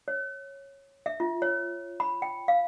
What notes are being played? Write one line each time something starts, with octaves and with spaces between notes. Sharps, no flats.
C#5
E5
F4
C#5
B5
G5
F5